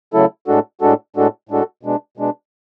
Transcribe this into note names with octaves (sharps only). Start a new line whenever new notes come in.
C#3 F#3 A3 E4 A4
A2 G#3 D4 F#4 A4
A2 G#3 D4 F#4 A4
A2 G#3 D4 F#4 A4
A2 G#3 D4 F#4 A4
B2 G#3 D4
B2 G#3 D4